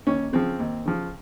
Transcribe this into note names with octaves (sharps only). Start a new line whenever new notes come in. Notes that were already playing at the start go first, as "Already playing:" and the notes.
D#2 C#4
C#3 F3 C4
D#2
C#3 F3